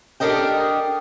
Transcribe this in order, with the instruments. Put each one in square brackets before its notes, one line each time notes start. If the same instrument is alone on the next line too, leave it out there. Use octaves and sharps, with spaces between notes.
[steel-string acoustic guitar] D4 G4 A4 A#4 D#5 G5